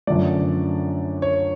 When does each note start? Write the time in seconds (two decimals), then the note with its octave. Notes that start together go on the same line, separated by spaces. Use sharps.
0.07 F#2 D3 F3 A3 D5
1.22 C#5